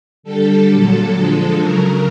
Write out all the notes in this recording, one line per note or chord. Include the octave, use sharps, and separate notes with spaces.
D3 G3 A4
A#2 F#3
D3 F3 G#3
C#3 F#3 A#4